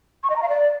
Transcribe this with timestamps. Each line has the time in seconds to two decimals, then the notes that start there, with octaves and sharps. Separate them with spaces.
0.23 C#6
0.30 D#5
0.36 A#5
0.42 F5
0.49 D5